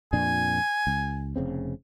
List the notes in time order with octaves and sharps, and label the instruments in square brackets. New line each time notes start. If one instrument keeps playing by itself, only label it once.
[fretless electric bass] F2 A#2 D4 [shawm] G#5
[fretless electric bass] C#2
F1 C#3 C4